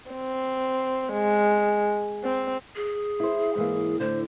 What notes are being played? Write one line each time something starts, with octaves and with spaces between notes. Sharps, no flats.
C4
G#3
C4
G#4
E4 C5
G#2 E3 A#3
A2 D3 C5